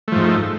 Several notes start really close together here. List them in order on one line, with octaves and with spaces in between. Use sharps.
A3 F3 G#2